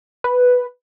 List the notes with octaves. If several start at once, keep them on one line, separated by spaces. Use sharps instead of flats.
B4